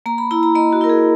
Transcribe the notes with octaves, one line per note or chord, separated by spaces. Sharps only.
A#3 A#5
B5
E4 A#5
A#5
A#3 D#5
F#4
E4 A#4
G#4